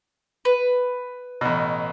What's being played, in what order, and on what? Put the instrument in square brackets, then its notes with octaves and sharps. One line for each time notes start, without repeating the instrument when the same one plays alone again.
[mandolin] B4
[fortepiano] A1 B2